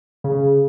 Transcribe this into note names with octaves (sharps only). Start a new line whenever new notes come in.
C#3